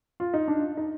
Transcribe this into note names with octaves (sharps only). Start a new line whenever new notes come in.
F4
D#4
D4
D#4